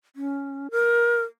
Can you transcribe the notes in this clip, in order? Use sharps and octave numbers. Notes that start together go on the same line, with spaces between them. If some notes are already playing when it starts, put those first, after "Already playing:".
C#4
A#4